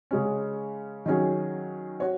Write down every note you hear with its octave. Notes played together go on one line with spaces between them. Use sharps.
C#3 G#3 C#4
D#3 F#3 C#4 G#4
F#4 C#5